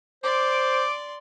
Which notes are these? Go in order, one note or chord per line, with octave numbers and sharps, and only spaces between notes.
C5 D5 C6 D6